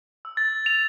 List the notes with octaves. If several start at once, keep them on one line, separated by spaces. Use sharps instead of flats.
E6
A6
F7